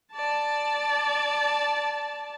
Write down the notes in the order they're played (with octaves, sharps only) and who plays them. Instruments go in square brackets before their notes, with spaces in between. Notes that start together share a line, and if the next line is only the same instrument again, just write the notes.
[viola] D5 A5